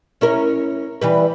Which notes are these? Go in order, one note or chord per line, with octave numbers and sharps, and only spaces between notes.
C#4 E4 A#4
E3 G3 B4